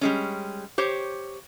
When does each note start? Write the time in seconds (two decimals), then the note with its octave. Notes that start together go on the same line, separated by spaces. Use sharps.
0.01 G3 G#3 C#4
0.78 G4 C5 C#5